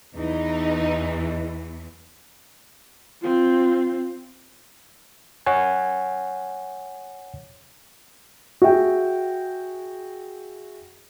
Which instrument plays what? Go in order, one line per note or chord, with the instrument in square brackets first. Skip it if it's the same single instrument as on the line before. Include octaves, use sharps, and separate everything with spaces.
[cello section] E2 E3 [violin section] D#4
[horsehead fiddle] C4 F4
[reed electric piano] C#5 F#5 G#5
[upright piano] F#4 G#4 E5 G5